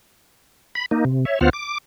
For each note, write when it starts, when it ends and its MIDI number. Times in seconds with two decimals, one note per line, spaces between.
0.75 0.86 83
0.91 1.05 58
0.91 1.05 63
1.05 1.25 48
1.25 1.39 73
1.25 1.39 76
1.41 1.50 38
1.41 1.50 59
1.41 1.50 65
1.41 1.50 72
1.41 1.50 78
1.41 1.50 89
1.53 1.78 86